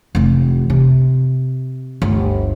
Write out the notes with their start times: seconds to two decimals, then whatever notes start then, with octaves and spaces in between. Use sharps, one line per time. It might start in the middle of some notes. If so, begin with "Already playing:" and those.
0.15 F1 E3
0.70 C3
2.02 G1 D2